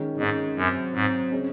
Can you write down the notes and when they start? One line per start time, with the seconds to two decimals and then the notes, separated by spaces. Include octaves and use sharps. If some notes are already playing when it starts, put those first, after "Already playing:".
Already playing: D#3 G#3 C#4
0.18 G#2 D#3 G#3 C#4
0.56 F#2 C3 F#3 C4
0.94 G#2 C3 F#3 C4
1.31 C#3 G#3 C#4